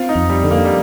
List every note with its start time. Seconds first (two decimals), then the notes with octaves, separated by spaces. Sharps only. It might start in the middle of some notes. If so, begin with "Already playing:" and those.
Already playing: C4 F4
0.09 D#4
0.15 F2
0.30 G3
0.44 D3
0.51 A#3
0.65 G3